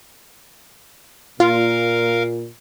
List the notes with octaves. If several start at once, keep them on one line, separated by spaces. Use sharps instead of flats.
A#2 F4 A#4 F5